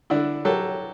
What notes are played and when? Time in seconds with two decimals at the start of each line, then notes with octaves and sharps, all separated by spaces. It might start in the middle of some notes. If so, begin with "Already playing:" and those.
0.10 D3 D4 E4
0.45 F#3 G4 A4